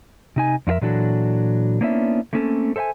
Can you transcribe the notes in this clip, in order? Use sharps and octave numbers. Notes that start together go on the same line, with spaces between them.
C3 D#4 G#5
F2 C#4 F4 A#4 E5
A#2 E3 F#3 D4 F#4 A4
A#3 B3 C#4 D4 E4 E5
A3 A#3 C4 C#4 G4 A4
A4 C5 E5 G5 G#5